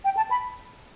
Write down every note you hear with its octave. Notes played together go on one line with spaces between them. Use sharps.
G5
A5
B5